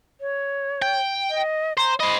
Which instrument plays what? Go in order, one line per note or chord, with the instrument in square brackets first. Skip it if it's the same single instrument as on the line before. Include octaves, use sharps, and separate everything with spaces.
[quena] C#5
[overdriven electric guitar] G5
[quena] D#5
[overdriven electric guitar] C5 [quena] A#5
[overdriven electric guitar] C5 D#5 [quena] B5